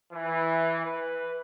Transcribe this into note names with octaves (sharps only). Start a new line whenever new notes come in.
E3
B4